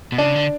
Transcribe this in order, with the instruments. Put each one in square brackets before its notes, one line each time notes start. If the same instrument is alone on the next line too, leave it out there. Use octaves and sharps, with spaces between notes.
[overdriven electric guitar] B2
[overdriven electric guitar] C#3 [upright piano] D4
[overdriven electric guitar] D3